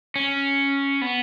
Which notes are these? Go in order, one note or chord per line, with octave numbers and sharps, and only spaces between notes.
C#4
B3